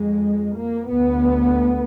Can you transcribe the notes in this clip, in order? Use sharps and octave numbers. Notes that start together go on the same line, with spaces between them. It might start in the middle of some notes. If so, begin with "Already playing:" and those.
Already playing: F2 G#3
A#3
D2 B3